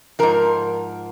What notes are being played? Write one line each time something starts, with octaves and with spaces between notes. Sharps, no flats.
G#2 F3 A#4